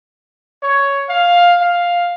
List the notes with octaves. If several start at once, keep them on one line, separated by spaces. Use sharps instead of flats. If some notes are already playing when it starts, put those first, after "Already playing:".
C#5
F5
F5